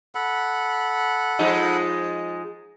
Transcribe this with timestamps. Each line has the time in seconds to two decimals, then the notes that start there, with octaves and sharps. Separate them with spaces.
0.15 A4 F#5 B5
1.39 F3 G#3 D#4